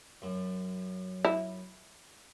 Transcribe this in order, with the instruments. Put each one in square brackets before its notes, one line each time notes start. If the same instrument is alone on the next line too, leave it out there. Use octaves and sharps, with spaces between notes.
[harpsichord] F#2
[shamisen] E4